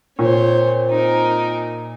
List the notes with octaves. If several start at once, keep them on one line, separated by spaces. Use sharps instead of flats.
A#2 C4 C5 C#5
D#4 A#4